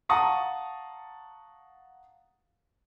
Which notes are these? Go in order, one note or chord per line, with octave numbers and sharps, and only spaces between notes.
F5 F#5 A5 A#5 C#6 D#6